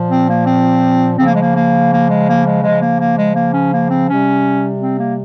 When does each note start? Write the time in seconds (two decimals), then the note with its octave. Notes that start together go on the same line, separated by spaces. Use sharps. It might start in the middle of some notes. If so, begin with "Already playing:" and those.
Already playing: A#2 F3
0.10 C4
0.29 A#3
0.46 C4
1.18 C#3 F3 C4
1.27 A#3
1.34 G#3
1.41 A#3
1.55 A#3
1.91 A#3
2.08 G#3
2.27 A#3
2.45 G#3
2.63 C#3 F3 G#3
2.81 A#3
2.99 A#3
3.17 G#3
3.35 A#3
3.54 C#4
3.72 A#3
3.90 C4
4.07 C3 G3 C#4
4.80 C4
4.99 A#3